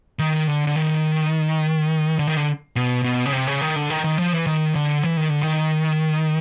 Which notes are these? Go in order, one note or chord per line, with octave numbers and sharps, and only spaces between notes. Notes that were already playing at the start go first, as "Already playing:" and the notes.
D#3
D3
D3
D#3
D3
D#3
D3
B2
B2
C#3
C3
C#3
D#3
D3
D#3
D#3
F3
E3
D#3
D3
E3
D#3
D3
D#3